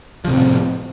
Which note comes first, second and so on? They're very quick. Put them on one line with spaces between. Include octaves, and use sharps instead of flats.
F3 C3 A2 C4